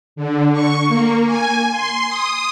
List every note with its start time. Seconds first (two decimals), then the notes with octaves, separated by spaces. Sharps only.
0.16 D3
0.52 C#6
0.88 A#3
1.26 G#5
1.70 C6
2.09 D#6